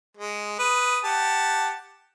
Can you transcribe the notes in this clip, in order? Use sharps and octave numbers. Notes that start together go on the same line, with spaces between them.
G#3
B4 D#6
G4 F#5 A5